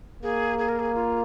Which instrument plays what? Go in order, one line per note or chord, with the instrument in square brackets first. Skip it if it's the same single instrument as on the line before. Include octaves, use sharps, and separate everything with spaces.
[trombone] A#3 [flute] G#4
[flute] G#4
A#4
G#4
F4